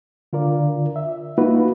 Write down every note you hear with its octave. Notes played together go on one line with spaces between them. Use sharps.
D3 F4 A#4 D5
E5
A#3 D#4 F4 F#4 B4